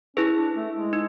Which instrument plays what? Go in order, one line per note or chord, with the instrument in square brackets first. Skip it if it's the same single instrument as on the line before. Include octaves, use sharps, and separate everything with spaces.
[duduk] C#4 [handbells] E4 G#4 B4
[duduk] D4
A3
G#3
[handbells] D#4